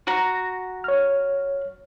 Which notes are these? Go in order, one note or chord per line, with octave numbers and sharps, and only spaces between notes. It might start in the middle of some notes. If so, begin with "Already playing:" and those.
F#4 A#5
C#5 F6